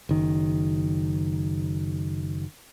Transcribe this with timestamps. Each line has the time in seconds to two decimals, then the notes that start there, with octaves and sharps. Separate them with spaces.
0.09 F#1 D#3